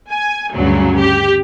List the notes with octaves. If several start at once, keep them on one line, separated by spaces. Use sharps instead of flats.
G#5
D2 G2 C#3 F#3
G4